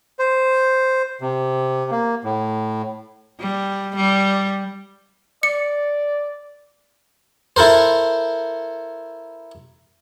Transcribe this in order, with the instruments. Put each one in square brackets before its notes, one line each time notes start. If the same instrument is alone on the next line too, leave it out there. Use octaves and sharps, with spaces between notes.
[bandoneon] C5
C3
A#3
A2
[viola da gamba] G3
G3
[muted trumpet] D5 [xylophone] C#7
[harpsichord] E4 A4 A#4 C5